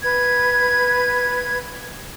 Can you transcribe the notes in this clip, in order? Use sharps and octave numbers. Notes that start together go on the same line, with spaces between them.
B4 G#6